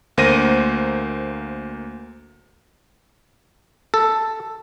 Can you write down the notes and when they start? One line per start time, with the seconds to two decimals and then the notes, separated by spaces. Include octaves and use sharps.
0.18 D2 A#3 C5 A#6 D#7
3.94 A4